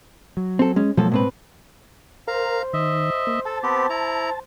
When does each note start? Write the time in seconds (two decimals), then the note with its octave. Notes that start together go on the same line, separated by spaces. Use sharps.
0.37 F#3
0.59 C4 A4
0.76 G#3 C#4
0.97 B2 F3 F#3 G#3 A#3 A4
1.12 A2 C4 B4
2.28 A#4 C5 F5 A#5
2.73 D#3 D#5 E5
3.27 A#3
3.45 A4 A5
3.63 B3 C4 G4
3.90 E4 A#5